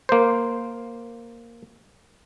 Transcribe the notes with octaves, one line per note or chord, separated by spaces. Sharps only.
A#3 C5